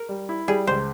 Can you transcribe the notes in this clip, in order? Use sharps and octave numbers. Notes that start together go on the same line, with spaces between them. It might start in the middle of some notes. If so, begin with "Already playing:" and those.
Already playing: A#4
G3
E4
G3 G#4
C#2 C5